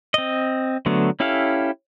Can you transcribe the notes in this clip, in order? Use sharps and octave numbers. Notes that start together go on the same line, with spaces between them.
C4 D#5
D3 F#3 A3 B3
C#4 E4 G4 A4 F5